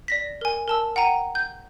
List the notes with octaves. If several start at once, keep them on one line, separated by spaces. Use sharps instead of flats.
D5 A#6 B6
A#4 G#5
A#4 A5 E6
F#5 G5 A#5 D#7
G6